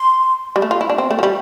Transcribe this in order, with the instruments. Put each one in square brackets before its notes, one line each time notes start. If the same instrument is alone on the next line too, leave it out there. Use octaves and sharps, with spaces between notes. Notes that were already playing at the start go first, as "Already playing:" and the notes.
Already playing: [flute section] C6
[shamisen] G3
A3
F4
E4
D4
C4
A3
F3
G3